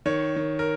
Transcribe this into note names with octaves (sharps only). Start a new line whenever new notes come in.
D#3 C#5
D#3
A#4